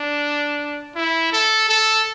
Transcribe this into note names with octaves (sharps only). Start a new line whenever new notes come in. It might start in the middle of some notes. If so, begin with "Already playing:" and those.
Already playing: D4
E4
A4
A4